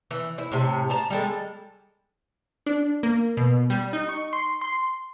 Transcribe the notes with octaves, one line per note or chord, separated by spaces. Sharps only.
E3
E4
A2 C3
A5 A#5
G3 G#3 A4
D4
A#3
B2
G3
D#4
C#6
C6
C6